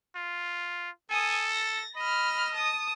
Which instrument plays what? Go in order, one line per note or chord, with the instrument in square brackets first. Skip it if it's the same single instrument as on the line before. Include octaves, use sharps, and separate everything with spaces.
[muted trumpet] F4
[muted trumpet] A4 [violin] G#5 D#6
[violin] A6 A#6
[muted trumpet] D#5 [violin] B5 F6
[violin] A5 D#6